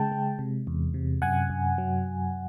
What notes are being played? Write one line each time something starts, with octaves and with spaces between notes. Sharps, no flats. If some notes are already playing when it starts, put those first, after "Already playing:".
Already playing: C#3 G#3 G5 A5
G#3
C3
E2
C3
F#2 F#5 G#5
F#2
F#3